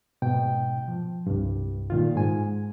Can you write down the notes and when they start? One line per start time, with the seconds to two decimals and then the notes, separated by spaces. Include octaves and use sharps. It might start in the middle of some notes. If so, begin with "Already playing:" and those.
0.22 G#2 B2 G5
0.88 F3
1.27 C2 G2
1.90 A#2 D#3 F4
2.15 G#2 G#5